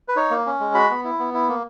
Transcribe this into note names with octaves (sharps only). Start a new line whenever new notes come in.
B4
D#4 C#5
A#3
C#4
G#3
F#4 B5
B3
E4
B3
E4
A#3